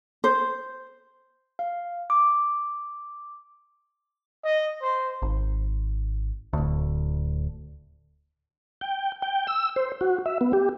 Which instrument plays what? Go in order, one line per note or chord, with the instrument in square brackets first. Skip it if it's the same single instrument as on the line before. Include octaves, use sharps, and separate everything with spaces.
[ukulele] C5
[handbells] F5
D6
[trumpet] D#5
C5
[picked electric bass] G#1
D1 D2
[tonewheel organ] G5
G5
E6
C5
F#4
E5
B3
G4